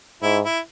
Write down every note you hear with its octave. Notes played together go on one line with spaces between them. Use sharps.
G#2 E4
E4